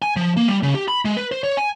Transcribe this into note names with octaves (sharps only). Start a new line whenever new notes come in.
G#5
F3
A#3
G3
C#3
G4
B5
G#3
B4
C5
C#5
G#5